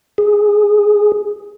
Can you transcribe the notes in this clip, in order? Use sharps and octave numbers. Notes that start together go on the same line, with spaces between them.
G#4